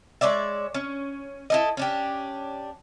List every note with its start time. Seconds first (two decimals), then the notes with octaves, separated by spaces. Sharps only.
0.21 G#3 C#5 D5 E5
0.74 C#4
1.50 E4 A4 D#5
1.77 C#4 D4 G4